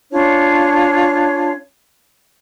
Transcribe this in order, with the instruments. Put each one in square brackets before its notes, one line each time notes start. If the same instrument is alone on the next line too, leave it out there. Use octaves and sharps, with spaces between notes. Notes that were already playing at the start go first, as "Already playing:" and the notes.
[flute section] C#4 D4 F4 C#5